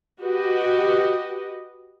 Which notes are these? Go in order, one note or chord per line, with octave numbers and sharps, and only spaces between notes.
F#4 G4 B4 D#5